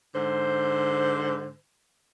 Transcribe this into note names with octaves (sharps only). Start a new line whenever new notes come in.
G#2 D3 C5